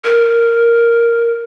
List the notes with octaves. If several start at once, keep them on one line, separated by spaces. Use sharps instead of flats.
A#4